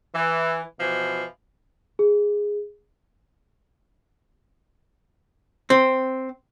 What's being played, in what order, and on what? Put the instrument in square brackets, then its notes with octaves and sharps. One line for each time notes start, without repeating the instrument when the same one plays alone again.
[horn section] E3
B2 E3 F3
[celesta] G#4
[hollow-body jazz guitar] C4